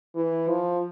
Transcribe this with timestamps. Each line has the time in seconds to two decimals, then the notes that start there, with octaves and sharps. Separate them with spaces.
0.15 E3
0.48 F3